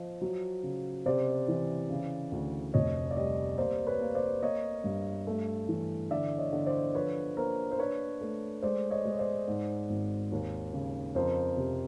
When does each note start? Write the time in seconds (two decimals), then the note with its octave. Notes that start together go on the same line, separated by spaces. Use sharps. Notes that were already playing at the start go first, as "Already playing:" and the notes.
Already playing: F3 D#5
0.21 F#3
0.63 C#3
1.06 C3 C5 D5
1.48 E3
1.90 C#3
2.32 D2
2.74 F1 C#5 D#5
3.11 D5
3.16 G3 C#5 D#5
3.58 A#3 C5 D5
3.86 B4 C#5
4.01 A#3
4.15 C5 D5
4.42 A#3 C#5 D#5
4.84 G2
5.27 A3
5.69 E3
6.11 D3 D5 E5
6.38 C#5 D#5
6.53 D3
6.66 C5 D5
6.95 F3 B4 C#5
7.37 A#3 A#4 C5
7.71 C5
7.79 D4 B4 C#5
8.21 A3
8.62 G#3 C5 D5
8.91 C#5 D#5
9.05 G#3
9.13 C#5
9.19 C5 D5
9.48 G#2
9.90 G#1
10.32 D#2
10.73 C#3
11.15 F2 A#4 C5
11.57 C3